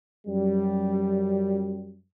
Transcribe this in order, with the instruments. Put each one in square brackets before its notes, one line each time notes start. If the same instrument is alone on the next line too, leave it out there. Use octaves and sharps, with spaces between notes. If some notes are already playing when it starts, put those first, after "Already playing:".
[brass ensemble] F#2 G3